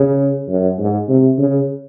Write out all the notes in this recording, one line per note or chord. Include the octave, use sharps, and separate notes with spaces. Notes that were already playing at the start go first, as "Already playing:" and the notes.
Already playing: C#3
F#2
G#2
C3
C#3